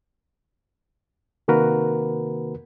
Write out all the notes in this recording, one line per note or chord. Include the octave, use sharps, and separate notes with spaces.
C3 D#3 A#3 F#4 A#4 B4